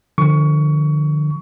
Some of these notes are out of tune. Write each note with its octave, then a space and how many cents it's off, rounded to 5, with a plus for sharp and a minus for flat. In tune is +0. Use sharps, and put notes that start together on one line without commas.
D3 +30 F3 +0 C#6 +20